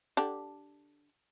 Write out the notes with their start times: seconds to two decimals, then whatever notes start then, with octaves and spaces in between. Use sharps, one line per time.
0.17 D3 D4 G4